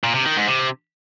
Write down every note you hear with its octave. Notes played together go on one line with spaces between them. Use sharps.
A#2
C3
D#3
G#2
C3